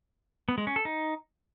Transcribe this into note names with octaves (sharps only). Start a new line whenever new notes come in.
B3
G#3
C#4
A4
D#4